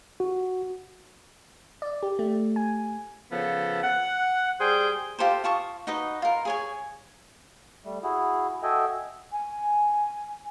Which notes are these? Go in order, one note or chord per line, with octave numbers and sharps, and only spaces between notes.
F#4
D5
G4
A3
G#5
C#3 F3 B3 A4
F#5
G3 G#4 C5 G5
F4 G4 A4 C5
F4 A5 C#6 D#6
D#4 F#4 B4 D#5
F4 A#4
G#4 C#5 G#5
G3 A3
E4 F#4 G#4
F#4 A4 D#5 E5 G5 G#5
G#5